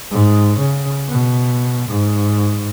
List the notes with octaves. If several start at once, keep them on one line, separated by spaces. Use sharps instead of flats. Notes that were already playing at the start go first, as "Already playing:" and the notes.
G#2
C#3
B2
G#2